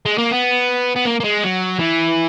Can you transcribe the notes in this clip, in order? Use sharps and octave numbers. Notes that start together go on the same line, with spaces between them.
G#3
A#3
B3
B3
A#3
A#3
G#3
F#3
E3